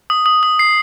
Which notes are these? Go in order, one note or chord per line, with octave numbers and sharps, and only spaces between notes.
D#6
D#6
D#6
C7